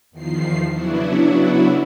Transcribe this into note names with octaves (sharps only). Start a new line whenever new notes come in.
E2 D#3 F3 C7
C#3 F#3 B3 D4 E4 F#4